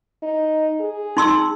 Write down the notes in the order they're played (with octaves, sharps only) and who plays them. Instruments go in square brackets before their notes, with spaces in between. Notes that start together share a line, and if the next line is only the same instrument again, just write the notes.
[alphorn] D#4
G#4
[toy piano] D#4 C6 E6